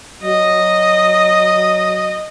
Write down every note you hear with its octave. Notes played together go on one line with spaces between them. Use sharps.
F#3 D#5